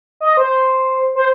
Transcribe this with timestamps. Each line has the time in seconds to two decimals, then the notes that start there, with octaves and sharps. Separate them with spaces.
0.21 D#5
0.37 C5
1.15 C5